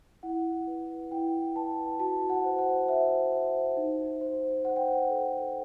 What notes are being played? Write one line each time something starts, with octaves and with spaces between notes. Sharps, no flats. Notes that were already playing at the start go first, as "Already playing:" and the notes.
E4 F#5
B4
E4 G5
B4 A5
F#4 A5
F#5
C5
F#5
C5 E5
C5
D#4
C5
C5 F#5
G5
F#5
A4